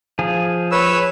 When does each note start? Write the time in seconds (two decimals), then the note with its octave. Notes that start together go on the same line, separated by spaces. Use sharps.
0.19 F3 G#4
0.71 B4 C#5 E6